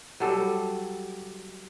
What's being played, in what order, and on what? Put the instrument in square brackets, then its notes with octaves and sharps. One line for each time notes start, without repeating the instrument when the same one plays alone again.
[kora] F#3 G3 A4